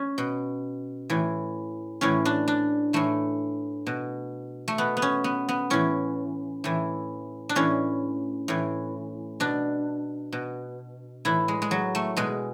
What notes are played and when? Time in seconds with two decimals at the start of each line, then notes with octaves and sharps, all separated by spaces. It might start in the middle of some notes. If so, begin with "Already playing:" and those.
Already playing: C#4
0.18 B2
1.10 A2 E3
2.01 A2 E3 C#4
2.25 D4
2.48 D4
2.93 A2 E3 A3
3.87 B2
4.68 A3
4.78 B2 B3
4.97 B3
5.02 C#4
5.24 B3
5.49 B3
5.70 A2 E3 C#4
6.64 A2 E3
7.49 D4
7.55 A2 E3 C#4
8.48 A2 E3
9.40 B2 D4
10.32 B2
11.25 A2 E3 E4
11.48 G#3
11.62 G#3
11.71 F#3
11.95 A3
12.17 B2 G#3